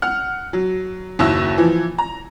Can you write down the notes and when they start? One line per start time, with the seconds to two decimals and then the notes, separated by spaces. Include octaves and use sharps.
0.02 F#5 F6
0.53 F#3
1.19 F#1 D#2 E4 F#4 E6
1.58 E3 F3
1.98 A#5